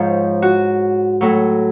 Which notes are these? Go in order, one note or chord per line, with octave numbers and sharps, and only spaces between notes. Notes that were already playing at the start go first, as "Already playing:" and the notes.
Already playing: G#2 F3 C#5
F#4
A2 F#3